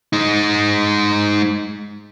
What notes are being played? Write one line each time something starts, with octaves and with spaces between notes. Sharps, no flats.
G#3 D#4